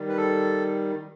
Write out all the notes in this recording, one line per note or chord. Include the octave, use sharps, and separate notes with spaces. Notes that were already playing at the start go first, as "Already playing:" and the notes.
Already playing: D#3 G3
B4
A4